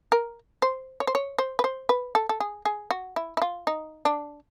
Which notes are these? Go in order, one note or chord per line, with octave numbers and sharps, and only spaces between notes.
A#4
C5
C#5
C5
C#5
C5
B4
C5
B4
A4
A4
G#4
G#4
F#4
E4
E4
F4
D#4
D4